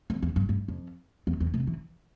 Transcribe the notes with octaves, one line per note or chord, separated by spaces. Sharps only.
F2
E2
G2
G2
F2
E2
E2
C3
E3